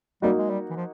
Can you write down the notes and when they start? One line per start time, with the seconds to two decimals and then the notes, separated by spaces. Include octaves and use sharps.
0.22 F#3 G3 A#3 D#4 F#4
0.38 G#3
0.50 G3
0.70 E3
0.76 F3